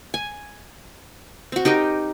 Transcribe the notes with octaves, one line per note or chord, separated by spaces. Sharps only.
G#5
C4 F#4
D#4 G4 A#4 D#5